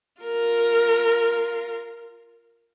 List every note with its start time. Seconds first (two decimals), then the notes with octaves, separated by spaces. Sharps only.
0.21 F4 A#4